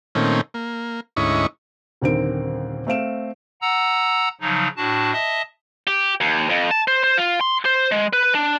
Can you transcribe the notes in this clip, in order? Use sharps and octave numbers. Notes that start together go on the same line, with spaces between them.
A#2 D#3 A3 C4 C#4
A#3
D2 G#2 C#4 E4 D#5 C#6
D#1 D#2 D3 C4 A#4 D7
A3 C4 F5 D7 E7
F#5 A#5 E6
C#3 F3 F#3 D#4
A2 D4 F#4 A5
D#5 E5 A5 D#6
G4
D#2
F2
A5
C5
C5
F4
C6
C5
G#3
B4
D4